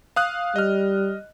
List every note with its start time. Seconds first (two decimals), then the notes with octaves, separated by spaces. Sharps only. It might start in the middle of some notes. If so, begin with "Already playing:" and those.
0.16 F5 D#6 F#6
0.56 G3 D#5 F6